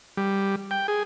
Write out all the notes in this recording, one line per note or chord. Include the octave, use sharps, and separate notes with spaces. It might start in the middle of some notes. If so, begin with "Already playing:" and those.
G3
G5
G#4